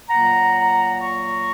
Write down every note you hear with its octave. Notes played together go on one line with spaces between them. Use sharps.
A#2 F#3 A#3 F#5 A#5
A#5 C#6